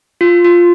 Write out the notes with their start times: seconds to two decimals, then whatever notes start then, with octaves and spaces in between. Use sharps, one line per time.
0.21 F4
0.45 F4